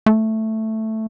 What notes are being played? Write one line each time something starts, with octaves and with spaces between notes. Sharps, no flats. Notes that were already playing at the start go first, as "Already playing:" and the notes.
A3